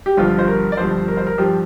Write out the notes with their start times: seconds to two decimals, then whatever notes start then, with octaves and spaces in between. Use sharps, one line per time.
0.06 G4
0.17 G1 G2 F3 F4
0.38 C5
0.48 A#4
0.72 D5
0.77 G1 G2 F3 C5
1.08 A#4
1.17 C5
1.27 A#4
1.38 G2 F3 G4